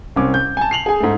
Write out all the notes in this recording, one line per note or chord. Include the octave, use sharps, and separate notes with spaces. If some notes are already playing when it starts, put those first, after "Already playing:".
C2 C4 C#4 D6
G6
G#5 A5
C7 F7 F#7
G#4 G#5
G#2 A3